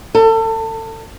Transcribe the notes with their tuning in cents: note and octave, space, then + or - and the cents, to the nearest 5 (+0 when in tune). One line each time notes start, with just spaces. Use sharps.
A4 +30